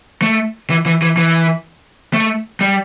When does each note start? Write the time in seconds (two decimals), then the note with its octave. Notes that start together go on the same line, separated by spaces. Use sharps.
0.22 A3
0.70 E3
0.86 E3
1.02 E3
1.17 E3
2.14 A3
2.61 G3